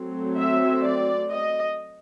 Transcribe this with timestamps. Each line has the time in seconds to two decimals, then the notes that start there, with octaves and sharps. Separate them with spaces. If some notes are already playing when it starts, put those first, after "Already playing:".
Already playing: F#3 A3 C4
0.36 E5
0.83 D5
1.30 D#5